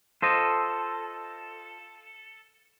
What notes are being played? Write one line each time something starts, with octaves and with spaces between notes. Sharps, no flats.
F4 A4 C5 D#5